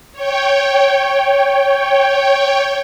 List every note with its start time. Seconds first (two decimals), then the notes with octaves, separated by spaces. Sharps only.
0.13 C#5 G5